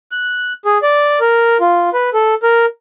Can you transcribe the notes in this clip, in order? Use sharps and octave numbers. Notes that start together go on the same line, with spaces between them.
F#6
G#4
D5
A#4
F4
B4
A4
A#4